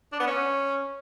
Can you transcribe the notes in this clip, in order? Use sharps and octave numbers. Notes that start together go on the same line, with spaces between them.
D4
B3
C#4